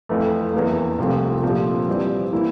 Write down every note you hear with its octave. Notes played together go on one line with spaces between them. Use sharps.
F2 E3 A3
E2 E3 A#3
C2 C3 F3 A3 C4
A#2 F3 A3 C4 G4
E3 G3 C4 G4 D5
E3 A#3 E4 A#4